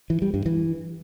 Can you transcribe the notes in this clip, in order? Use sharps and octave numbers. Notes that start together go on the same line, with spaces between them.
E3
G3
G2
E3